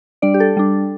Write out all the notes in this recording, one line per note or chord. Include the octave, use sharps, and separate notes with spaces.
G3 D4 D5
G4
A4
G3 D4